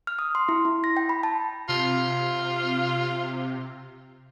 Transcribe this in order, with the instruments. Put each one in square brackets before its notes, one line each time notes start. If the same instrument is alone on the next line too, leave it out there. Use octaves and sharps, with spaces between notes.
[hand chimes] F6
D#6
C6
E4
E4
A#6
G5
B5
A5
[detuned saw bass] C3 [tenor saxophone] F4